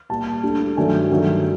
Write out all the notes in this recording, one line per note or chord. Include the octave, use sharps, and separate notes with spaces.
A#2 G3 A5
D2 D3 G3
G2 D#3 F#3 A3 G#5
G2 D#3 F#3 A3